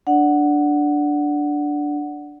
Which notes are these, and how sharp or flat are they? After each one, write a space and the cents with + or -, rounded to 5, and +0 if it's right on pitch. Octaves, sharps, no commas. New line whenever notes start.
D4 +0 D5 +0 F#5 +0